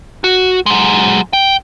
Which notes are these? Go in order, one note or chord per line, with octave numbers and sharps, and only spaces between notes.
F#4
F#3 G#3
G5